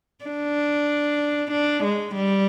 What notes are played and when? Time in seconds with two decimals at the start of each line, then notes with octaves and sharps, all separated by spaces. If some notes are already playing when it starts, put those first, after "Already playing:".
0.25 D4
1.52 D4
1.84 G#3
2.15 G3